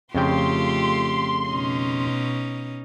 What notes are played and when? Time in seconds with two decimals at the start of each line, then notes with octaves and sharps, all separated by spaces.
0.15 F2 C#3 A3 F4 G4 G5 C6
1.48 B2 C#4 D#4